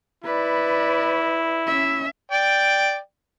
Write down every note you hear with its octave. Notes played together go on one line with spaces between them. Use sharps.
E4 B4 D5
C#4 E5
D5 G5